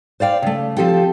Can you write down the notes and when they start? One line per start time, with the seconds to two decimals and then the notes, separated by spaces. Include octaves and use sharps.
0.20 C5 D5 F5 G5
0.42 C#3 A3
0.77 F3 C4 G4 A4 G5